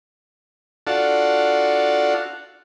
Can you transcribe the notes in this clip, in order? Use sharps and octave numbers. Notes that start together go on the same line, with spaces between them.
D4 F4 F#4 A4